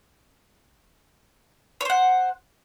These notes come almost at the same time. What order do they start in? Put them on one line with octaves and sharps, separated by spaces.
C#5 C5 F#5